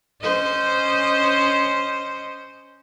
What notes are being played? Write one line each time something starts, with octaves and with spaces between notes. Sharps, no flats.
C#4 C5 D#5